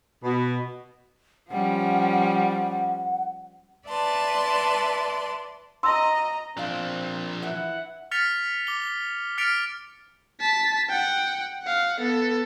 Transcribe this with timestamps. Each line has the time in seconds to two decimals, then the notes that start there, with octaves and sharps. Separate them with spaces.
0.23 B2
1.50 F3 G3 C#4 F#5
3.88 B4 D5 E5 A5 C6
5.83 D#5 A#5 C6 E6
6.57 F3 C4 D4 F5 A5
7.43 E3 E4 F#5
8.11 F6 A6 B6 C#7 F7
8.67 D6 G7
9.38 F6 A6 B6 C#7 D7 F7
10.40 A5 B6
10.89 F#5 G5
11.63 F5 F#5
12.00 B3 A4